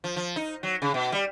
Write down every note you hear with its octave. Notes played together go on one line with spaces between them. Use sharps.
F3
F3
D#4
F#3
C#3
B2
G3